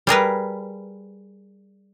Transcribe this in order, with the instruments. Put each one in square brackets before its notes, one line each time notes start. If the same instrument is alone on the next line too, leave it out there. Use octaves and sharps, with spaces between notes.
[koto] G3 G#4 A#4 B4